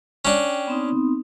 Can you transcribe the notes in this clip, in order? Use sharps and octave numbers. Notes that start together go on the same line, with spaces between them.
C#4 D4 G5
B3 C4 D#4